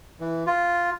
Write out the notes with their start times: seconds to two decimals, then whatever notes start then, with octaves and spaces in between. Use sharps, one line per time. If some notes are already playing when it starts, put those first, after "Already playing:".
0.20 E3
0.47 F4